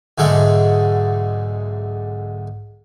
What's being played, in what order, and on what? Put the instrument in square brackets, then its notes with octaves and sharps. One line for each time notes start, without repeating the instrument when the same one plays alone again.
[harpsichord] B1 G#2 D3 G#3 A3 E5